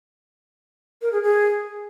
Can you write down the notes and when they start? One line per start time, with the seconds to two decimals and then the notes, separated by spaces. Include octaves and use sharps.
1.02 A#4
1.12 G#4
1.23 G#4